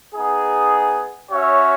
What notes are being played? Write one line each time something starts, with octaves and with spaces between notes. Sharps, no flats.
B3 D#4 G#4
C#4 F#4 C#5 E5